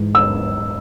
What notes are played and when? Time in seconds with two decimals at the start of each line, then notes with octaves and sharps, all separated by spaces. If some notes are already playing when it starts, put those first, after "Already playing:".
Already playing: G#2 E3
0.15 E6